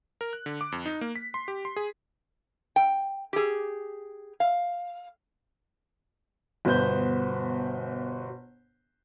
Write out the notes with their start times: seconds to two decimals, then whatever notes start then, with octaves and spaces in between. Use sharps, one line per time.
0.21 A#4
0.33 F#6
0.46 D3
0.61 D6
0.72 F2
0.86 D#4
1.01 A#3
1.16 B6
1.34 C6
1.48 G4
1.65 C6
1.76 G#4
2.76 G5
3.33 G4 G#4
4.40 F5
6.65 G1 B2 B4 C5 G6